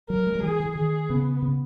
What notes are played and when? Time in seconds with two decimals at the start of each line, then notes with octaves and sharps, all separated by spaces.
0.09 F#3 A#4
0.27 G#3
0.35 F#3
0.43 E3 G#4
0.60 E3
0.75 D#3 G#4
1.10 C#3 B3
1.42 C#3